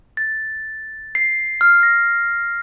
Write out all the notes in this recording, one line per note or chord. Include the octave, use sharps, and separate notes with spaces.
A6
C7
F6
A#6